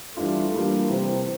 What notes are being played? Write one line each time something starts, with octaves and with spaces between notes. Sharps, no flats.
E3 G3 A3 D4 F4
E3 G3 A#3 D4 F4
C3 E3 G3 C4